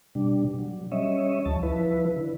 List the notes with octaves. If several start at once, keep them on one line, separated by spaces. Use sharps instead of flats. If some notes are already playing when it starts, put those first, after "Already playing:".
B2 G3 D4
F#3
G3 C#4 C#5 D#5 E5
D2 F3 A5
F3 E4 B4
D3